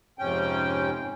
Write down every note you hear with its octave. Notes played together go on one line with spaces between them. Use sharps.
F2 G#2 C3 C#4 G5